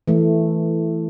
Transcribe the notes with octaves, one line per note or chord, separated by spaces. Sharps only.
E3 A3